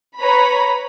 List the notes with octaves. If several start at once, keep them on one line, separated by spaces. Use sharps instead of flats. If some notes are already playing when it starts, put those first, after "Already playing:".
B4 C#5 A#5 B5